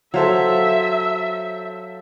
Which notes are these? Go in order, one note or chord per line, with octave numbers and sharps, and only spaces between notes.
F#3 A4 C5 E5 F5